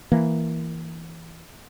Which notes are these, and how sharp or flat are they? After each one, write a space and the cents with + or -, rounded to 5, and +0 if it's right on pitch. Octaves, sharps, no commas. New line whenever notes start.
E3 +0 A#3 +0